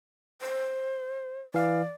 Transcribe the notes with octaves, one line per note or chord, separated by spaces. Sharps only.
C5
E3 D5 F5